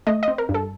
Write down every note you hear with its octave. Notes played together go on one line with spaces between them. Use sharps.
A3 D#5
D#5
C4
A#4
G2
A4